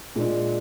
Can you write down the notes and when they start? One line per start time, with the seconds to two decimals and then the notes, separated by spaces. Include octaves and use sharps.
0.16 A#2 G#3 D4